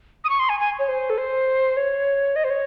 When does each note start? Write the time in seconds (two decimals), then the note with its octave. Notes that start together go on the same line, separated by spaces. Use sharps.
0.24 D#6
0.29 C#6
0.39 C6
0.49 G#5
0.60 G#5
0.79 C#5
0.88 C5
1.10 A4
1.18 C5
1.77 C#5
2.36 D#5
2.44 C5
2.50 C#5